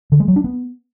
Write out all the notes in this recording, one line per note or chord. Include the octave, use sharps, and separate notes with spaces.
D3
G#3
F#3
D4
B3